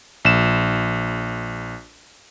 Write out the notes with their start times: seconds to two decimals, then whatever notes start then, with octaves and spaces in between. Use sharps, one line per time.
0.25 A#1 E7